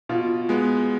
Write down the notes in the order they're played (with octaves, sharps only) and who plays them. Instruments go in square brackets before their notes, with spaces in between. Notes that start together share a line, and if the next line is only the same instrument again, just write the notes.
[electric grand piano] B2 [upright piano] F4
[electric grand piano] G#3 B3